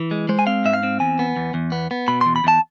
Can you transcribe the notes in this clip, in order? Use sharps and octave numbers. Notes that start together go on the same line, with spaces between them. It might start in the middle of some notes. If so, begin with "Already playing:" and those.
Already playing: E3
G#3
G#3 C5
G#5
C4 F5
G#2 E5
F5
C4
E2 G#5
B3
E2
E2
B3
B3
B2 B5
E2 C6
B5
E2 A5